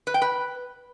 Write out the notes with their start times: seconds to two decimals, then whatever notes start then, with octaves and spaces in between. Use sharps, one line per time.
0.07 B4
0.14 G5
0.22 B4